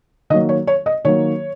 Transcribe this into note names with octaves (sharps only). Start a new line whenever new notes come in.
D#3 F#3 A#3 D#5
C#5
C#5
D#5
D#3 F#3 A#3 C#5